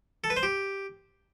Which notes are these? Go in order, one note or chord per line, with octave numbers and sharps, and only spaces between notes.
A4
B4
C5
G4